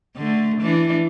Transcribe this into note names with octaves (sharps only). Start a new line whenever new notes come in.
D3 A3
E3 D4